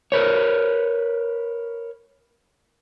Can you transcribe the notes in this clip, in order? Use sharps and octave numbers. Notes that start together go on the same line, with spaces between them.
A#4 B4 C#5